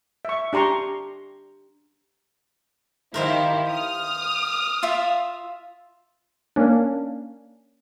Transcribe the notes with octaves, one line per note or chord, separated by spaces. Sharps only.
E5 C#6
D4 G4 A#5 C6 C#6
D#3 E4 G4 A#4 C5 F5
D#6 F6
F4 E5 F5
A#3 C#4 D4